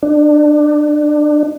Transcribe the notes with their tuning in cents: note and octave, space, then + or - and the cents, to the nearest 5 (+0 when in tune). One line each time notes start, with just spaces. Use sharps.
D4 +25